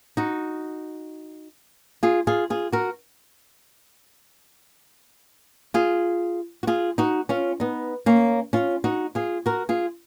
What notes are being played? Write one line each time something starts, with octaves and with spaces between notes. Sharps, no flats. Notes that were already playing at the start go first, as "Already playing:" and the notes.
D#4 F#4
F4 G#4
F4 G#4
F4 G#4
F#4 A#4
F4 G#4
F#4
F4 G#4
D#4 F#4
C#4 F4
B3 D#4
A#3 C#4
C#4 F4
D#4 F#4
F4 G#4
F#4 A#4
F4 G#4